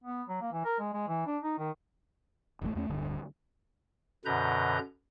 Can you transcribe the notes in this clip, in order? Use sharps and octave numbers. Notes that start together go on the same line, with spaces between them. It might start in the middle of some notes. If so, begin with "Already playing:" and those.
B3
F#3
A#3
E3
A#4
G#3
G#3
E3
D4
D#4
D#3
E1 A1 C#3 A3
E2 A3 C#4
D1 G2 D3
F#2 B2 D3 B4 A#5 G6